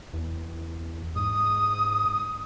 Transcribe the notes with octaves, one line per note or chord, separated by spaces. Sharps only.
E2
G#2 D#6